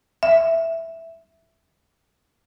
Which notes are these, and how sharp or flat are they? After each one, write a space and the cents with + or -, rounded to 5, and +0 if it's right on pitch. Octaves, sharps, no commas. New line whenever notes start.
E5 +0